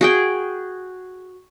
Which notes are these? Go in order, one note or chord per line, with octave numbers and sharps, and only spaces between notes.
F#4 G#4 G5